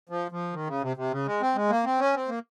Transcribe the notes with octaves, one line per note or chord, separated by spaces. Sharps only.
F3
F3
D#3
C#3
C3
C3
C#3
G#3
C4
G#3
A#3
C4
C#4
C4
A#3